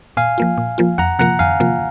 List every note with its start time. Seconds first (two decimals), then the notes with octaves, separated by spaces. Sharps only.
0.17 A#2 F5 G#5
0.38 F3 A#3 F4
0.58 A#2
0.78 F3 A#3 F4
0.98 F2 F#5 A#5
1.19 C3 F3 A#3 F4 F#5 A#5
1.39 F2 F5 G#5
1.60 C3 F3 A#3 F4